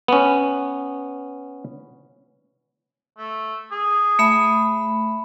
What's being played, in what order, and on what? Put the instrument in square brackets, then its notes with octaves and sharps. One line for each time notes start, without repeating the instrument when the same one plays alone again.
[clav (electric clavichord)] B3 C#4
[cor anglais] A3
G#4
[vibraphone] A3 E5 B5